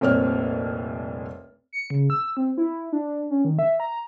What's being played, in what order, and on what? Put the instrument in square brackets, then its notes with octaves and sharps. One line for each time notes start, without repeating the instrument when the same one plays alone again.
[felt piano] F1 C2 A#2 C4 C#5 F6
[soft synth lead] C#7
C#3
E6
C4
E4
D4
C#4
D#3
E5
A#5